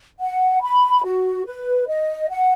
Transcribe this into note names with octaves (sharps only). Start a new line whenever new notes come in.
F#5
B5
F#4
B4
D#5
F#5